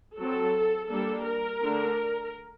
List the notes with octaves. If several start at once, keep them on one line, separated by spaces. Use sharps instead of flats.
F#3 C4 A4
G3 A#3 D4 A4
A#4
D3 A3 D4